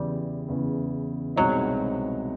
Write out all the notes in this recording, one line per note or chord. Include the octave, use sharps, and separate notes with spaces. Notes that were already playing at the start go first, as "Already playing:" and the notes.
Already playing: E2 C#3 E3 G3
E2 C#3 E3
C2 B2 F#3 G#3 C4 D#4